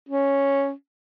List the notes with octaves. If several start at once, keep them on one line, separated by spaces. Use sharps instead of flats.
C#4